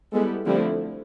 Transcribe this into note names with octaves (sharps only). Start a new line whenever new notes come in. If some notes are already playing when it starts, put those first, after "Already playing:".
G3 G#3 B3 E4 A4
D3 F3 G3 A3 C4 E4